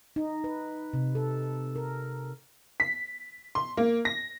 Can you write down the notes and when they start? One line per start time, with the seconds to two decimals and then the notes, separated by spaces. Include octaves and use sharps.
0.16 D#4
0.44 B4
0.93 C3
1.15 A4
1.76 A#4
2.80 B6
3.55 C6
3.77 A#3
4.05 A#6